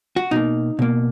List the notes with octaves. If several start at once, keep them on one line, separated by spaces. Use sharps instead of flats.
F#4
B2 A#3 D#4
B2 A#3